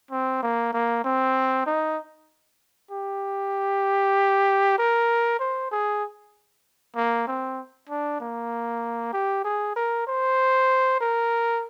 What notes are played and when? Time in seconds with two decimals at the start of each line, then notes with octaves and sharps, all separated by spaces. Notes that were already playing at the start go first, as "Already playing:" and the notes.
0.11 C4
0.43 A#3
0.73 A#3
1.04 C4
1.66 D#4
2.91 G4
4.78 A#4
5.40 C5
5.71 G#4
6.96 A#3
7.28 C4
7.89 D4
8.20 A#3
9.13 G4
9.44 G#4
9.76 A#4
10.07 C5
11.01 A#4